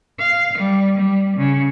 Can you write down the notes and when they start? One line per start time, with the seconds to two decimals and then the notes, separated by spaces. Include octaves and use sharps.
0.19 F5
0.58 G3
0.97 G3
1.37 C#3